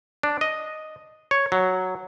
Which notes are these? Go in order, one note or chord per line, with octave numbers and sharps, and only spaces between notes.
D4
D#5
C#5
F#3